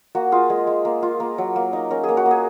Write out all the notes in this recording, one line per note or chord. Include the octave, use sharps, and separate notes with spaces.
A#3 F#4
F4 G#4
G#3 G#4
G#3
A#3
F4
A#3
F#3
A#3
D#4
C#4 A#4
A#3 G#4
F#4
A#3
G#4